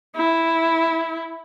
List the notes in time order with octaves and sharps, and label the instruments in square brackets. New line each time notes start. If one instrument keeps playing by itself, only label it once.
[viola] E4